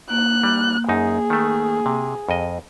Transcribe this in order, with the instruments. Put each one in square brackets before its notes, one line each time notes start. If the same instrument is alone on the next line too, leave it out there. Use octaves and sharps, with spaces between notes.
[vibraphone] A#3 [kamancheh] F#6
[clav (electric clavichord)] G3
[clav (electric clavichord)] F#2 D#4 [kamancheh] G#4
[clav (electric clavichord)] D#3 A3
C3
F2 D#5